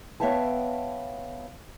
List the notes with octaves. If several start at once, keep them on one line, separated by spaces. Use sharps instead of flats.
B3 C#5 E5 F5 G5 A5